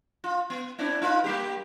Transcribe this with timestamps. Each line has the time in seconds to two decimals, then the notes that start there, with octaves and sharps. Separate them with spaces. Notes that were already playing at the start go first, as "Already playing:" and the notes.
0.24 F4
0.50 B3
0.78 C4 D4 E4
1.02 D#4 F4 B4
1.24 G3 A#3 G4